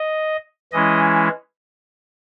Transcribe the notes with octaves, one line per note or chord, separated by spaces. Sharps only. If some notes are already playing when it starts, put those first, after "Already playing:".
Already playing: D#5
E3 G#3 C#4 E4 D#5